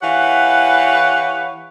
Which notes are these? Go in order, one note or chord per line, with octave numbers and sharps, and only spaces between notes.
E3 G4 B4 C#5 F5 F#5